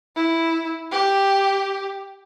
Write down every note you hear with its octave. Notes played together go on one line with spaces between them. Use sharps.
E4
G4